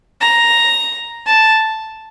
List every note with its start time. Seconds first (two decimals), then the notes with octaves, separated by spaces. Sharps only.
0.21 A#5
1.26 A5